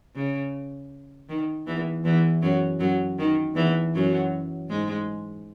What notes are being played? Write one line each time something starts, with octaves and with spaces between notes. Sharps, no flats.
C#3
D#3
E2 E3
E2 E3
F#2 F#3
F#2 F#3
D#3
E2 E3
F#2 F#3
G#2 G#3